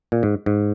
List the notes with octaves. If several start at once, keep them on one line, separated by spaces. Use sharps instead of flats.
A#2
G#2
G#2